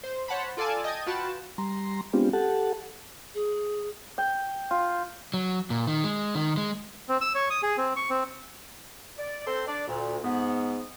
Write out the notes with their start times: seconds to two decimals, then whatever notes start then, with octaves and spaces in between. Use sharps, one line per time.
0.04 C5
0.28 C5 C#5 F#5 A5 B5
0.57 F4 A4 D5 F5 G#5 A5
0.84 D#5 G5 A5 G#6
1.06 F4 F#4 B4 G5 A5
1.58 G3 A#5 C6
2.13 G#3 B3 C4 D4 F4 G4
2.33 G4 A4 F#5 A5
3.34 G#4
4.18 G5
4.71 F4
5.34 F#3
5.70 A#2
5.87 D#3
6.04 G#3
6.35 D#3
6.57 G#3
7.09 C4
7.21 E6
7.35 C#5
7.50 D#6
7.63 G#4
7.78 C4
7.96 C#6
8.10 C4
9.18 D5
9.47 C4 A4 C5 C6
9.67 D4 D5
9.88 D2 A#2
10.23 G#2 B3